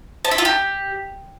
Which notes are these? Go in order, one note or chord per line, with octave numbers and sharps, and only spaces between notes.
A5
E5
F4
G4